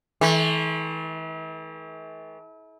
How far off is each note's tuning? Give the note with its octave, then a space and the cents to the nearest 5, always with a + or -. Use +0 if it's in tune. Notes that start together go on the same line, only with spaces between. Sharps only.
E3 -40 A3 -45